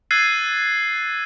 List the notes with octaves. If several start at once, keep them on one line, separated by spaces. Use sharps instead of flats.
E6 F#6 G#6 A6 C7 D#7